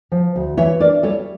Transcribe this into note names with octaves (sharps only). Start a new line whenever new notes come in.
F3
D2
E3 C#5 E5
D4 A#4 D5
G3 A4 C#5